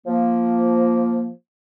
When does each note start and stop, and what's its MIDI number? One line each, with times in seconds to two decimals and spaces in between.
0.07 1.29 53
0.07 1.29 58